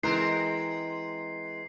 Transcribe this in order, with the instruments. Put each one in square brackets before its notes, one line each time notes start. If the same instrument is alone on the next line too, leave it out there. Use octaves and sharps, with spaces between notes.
[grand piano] E3 [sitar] G#3 C4 A#4 [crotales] C7